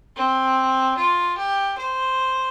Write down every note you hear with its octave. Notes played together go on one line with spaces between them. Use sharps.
C4
F4
G4
C5